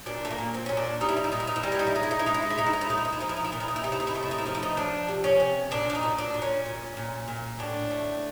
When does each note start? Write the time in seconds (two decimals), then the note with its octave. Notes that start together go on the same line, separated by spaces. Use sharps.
0.06 A#2 D4
0.25 A3
0.30 A#3
0.38 A#2
0.54 C4
0.66 A#2 C#4
0.77 D4
1.01 G3 D#4
1.09 E4
1.17 D#4
1.24 E4
1.32 A#2 D#4
1.40 E4
1.47 D#4
1.56 E4
1.63 G3 D#4
1.72 E4
1.79 D#4
1.87 E4
1.95 G#3 D#4
2.03 E4
2.11 D#4
2.19 E4
2.26 G#3 D#4
2.34 E4
2.42 D#4
2.50 E4
2.58 G#3 D#4
2.66 E4
2.73 D#4
2.81 E4
2.89 A#2 D#4
2.98 E4
3.05 D#4
3.13 E4
3.20 F3 D#4
3.29 E4
3.37 D#4
3.45 E4
3.52 A#2 D#4
3.60 E4
3.68 D#4
3.76 E4
3.83 C3 D#4
3.92 E4
4.00 D#4
4.07 E4
4.15 A3 D#4
4.23 E4
4.31 D#4
4.38 E4
4.46 F3 D#4
4.55 E4
4.63 D#4
4.77 F3 D4
5.09 C3
5.24 C#4
5.40 C3
5.71 A#2 D4
5.90 D4
5.95 D#4
6.03 A#2
6.18 D4
6.34 A#2
6.42 C#4
6.65 A#2
6.97 A#2
7.28 A#2
7.59 A2 D4
7.91 A3